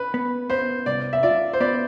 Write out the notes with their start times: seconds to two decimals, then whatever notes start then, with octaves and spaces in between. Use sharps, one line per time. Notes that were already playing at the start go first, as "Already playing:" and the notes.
Already playing: B4
0.14 B3
0.50 B3 C5
0.86 C2 D5
1.13 E5
1.23 F4 D5
1.53 C5
1.60 B3 D5